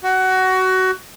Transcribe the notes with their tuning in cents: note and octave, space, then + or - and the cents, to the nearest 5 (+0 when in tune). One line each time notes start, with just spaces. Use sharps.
F#4 +20